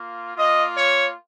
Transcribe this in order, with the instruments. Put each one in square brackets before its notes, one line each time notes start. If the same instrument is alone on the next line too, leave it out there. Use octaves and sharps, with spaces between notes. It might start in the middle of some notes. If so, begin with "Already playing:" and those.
Already playing: [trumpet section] A#3 F4
A#3 F4 D#5
C#5